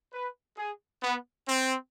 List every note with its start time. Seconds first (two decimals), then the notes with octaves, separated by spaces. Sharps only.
0.13 B4
0.57 G#4
1.03 B3
1.48 C4